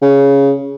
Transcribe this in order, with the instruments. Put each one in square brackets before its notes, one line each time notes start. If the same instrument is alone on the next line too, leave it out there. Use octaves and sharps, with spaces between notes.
[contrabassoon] C#3